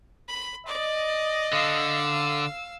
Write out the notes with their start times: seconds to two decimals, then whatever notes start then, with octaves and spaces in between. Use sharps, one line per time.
0.29 B5
0.67 D5 D#5
1.53 D3 F5 E6